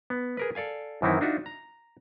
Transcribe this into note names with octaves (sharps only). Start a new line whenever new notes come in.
B3
G#4 A#4 B4
A4 D5 F5 G#5
F#2 D#3 E3 C4 D#4 E4
D4 D#4 F4 F#4 E5
A#5